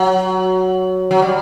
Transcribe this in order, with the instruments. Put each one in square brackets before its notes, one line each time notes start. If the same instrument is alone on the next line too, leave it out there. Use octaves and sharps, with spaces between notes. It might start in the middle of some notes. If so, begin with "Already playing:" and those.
Already playing: [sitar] F#3
F#3
G3